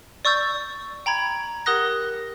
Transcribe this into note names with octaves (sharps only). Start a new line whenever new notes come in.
D5 C#6 E6 G6 A6
G5 A#5 B5 G#6
G4 A#4 F#5 D#6 F#6 A#6